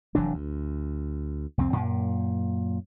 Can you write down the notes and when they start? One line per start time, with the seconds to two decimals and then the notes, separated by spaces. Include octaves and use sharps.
0.15 F1 E3 F#3 D4
0.34 D2
1.58 C2 F2 F#3 C4
1.73 F#2 A#2